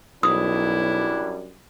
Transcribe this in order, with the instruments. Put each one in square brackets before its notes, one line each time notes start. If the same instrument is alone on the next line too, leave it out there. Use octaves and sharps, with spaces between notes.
[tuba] B1 [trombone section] F#2 G3 D4 [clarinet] E4 [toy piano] D#6